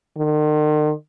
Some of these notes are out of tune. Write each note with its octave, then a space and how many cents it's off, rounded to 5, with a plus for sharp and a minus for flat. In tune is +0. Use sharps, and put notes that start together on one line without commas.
D#3 -45